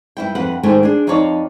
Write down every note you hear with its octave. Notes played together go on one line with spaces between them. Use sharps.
G2 E4 G5
F2 B4 F#5
G#2 D#3 A3 C5 G5 G#5
D4 G#4
F2 D#4 F4 C#5 D5 A5